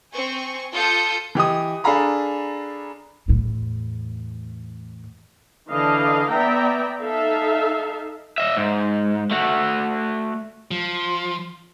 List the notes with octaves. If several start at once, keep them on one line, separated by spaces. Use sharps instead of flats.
C4 G#5 C#6
F4 A4 A5 D#6 G6 C#7
E3 G4 D#5 D#6
D4 G#4 A4 F5 A#5 B5
E2 A2
D3 E3 D4 D#5 F5
B3 D5 E5 G5 A#5
D#4 A4 E5 F5
D#5 E5
G#2
A3 F#4
F3